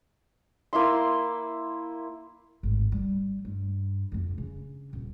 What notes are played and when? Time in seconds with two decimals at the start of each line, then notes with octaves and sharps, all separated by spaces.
0.73 A#3 E4 E5 C6
2.63 G#1 A2
2.92 G3
3.45 G2
4.12 F2 D3
4.38 C#3 D4
4.93 D#1